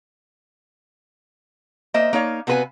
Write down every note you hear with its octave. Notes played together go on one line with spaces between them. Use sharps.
A#3 C5 D#5 E5
A#3 D#4 C#5 F5
C3 B3 F#4 B4 F5 G#5